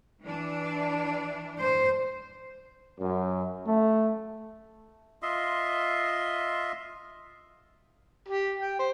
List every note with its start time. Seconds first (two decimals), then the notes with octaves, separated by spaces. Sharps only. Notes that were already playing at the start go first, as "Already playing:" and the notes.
0.21 E3 D4
1.59 C5
3.00 F#2
3.66 A3
5.22 F4 D#5 E5 C6
8.28 G4
8.62 G5
8.79 C5